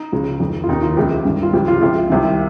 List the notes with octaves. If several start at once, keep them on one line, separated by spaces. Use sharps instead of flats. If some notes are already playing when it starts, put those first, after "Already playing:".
Already playing: D#4
C#2 C#3 F3
F2 D#3
F4
D#2 D#3 D#4
F4
C#2 C3 F3 G4
G2 D#3
F4
C#2 C#3 F3 G4
F4
C#2 C3 F3 F4
C2 C3 D#3